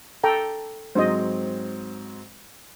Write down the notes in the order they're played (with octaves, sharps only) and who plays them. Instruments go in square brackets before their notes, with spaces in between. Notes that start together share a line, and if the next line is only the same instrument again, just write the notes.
[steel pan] A4 G5 A#5
[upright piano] G#2 F#3 C4 [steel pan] C5 D#5